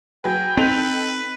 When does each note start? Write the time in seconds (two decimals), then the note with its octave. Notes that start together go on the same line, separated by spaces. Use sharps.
0.24 F#3 G#4 B4 G5
0.57 C4 D#4 A4 B4 F7